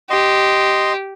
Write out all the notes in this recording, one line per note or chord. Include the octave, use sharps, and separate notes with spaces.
G4 D#5 C6